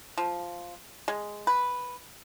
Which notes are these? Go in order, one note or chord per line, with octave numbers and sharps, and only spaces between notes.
F3
G#3
B4